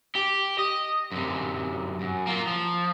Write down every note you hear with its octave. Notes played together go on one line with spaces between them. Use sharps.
G4
D#5
F#2 C3
F#2
A#3 F4
F3